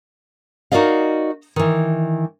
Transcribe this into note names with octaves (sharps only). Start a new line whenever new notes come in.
D#4 F#4 A#4 D5 D#5 F5
D#3 E3